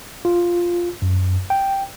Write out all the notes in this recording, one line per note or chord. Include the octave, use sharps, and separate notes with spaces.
F4
F#2
G5